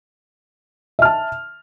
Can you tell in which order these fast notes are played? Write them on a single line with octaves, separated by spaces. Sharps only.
E5 F6 A5